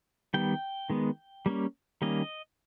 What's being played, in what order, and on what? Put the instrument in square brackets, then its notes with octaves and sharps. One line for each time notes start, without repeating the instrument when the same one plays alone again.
[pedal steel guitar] D#3 G3 B3 G5
D#3 G#3 B3
G3 A#3 C#4
D#3 G3 A#3 C#4 D#5